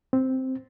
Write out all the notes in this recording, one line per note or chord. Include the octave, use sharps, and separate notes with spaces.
C4